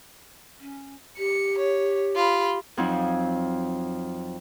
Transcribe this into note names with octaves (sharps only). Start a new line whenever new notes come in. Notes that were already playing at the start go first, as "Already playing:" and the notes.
C#4
G4 C#7
C#5
F4 B5
F2 F3 F#3 D#4